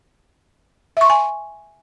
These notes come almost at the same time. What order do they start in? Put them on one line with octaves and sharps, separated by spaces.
E5 C#6 C6 G#5